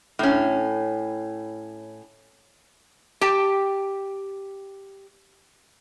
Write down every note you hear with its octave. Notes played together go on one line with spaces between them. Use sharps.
A2 C#4
G4 G5 A5